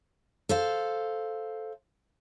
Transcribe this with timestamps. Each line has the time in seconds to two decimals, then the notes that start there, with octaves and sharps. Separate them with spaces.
0.49 A4 C5 F5